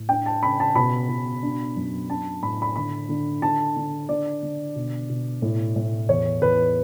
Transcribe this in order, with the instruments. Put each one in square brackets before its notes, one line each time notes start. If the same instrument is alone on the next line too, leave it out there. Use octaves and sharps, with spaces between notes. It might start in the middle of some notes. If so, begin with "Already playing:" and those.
Already playing: [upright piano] A2
D4 G5
A5
C#3 B5
A5
B2 B5
B2
D4
F#2
D4 A5
A2 B5
B5
D3 B5
D3
D3 A5
D3
D3 D5
D3
B2
B2
A2
A2
E2 C#5
E2 B4